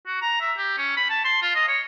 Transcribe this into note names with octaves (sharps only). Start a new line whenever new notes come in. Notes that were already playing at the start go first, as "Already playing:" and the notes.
F#4
A#5
E5
G4
C#4
B5
A5
C6
F4
D#5
C#5